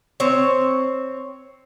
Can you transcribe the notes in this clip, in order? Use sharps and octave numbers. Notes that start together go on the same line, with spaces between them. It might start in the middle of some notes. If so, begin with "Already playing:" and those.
C4 C#5